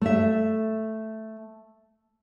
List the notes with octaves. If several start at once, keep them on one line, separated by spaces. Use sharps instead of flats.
A3 E5